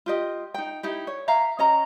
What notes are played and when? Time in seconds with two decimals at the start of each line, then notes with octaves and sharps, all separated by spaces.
0.06 F4 G4 D#5
0.54 D#4 G5
0.83 D#4 E4 G4
1.07 C#5
1.28 E5 F5 A#5
1.59 C#4 D#5 A#5